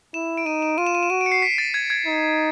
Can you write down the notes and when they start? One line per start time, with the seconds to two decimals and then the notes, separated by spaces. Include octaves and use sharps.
0.14 E4 E7
0.37 D7
0.46 D#4 D#7
0.62 E7
0.78 F4 D#7
0.87 E7
0.95 D#7
1.03 E7
1.10 F#4 D#7
1.21 D7
1.26 C#7
1.32 C7
1.42 B6
1.58 A6
1.74 G#6
1.90 G#6
2.06 D#4